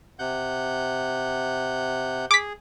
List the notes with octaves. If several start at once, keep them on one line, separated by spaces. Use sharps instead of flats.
C3 F#5 G6
G#4 D6 B6